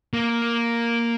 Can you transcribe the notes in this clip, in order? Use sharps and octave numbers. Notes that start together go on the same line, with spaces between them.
A#3